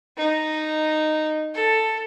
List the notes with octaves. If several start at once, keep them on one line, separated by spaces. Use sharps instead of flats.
D#4
A4